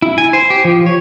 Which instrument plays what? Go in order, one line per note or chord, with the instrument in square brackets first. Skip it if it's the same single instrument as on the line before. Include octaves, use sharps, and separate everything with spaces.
[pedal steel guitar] E4
G#5
C5
G4
F3
C#5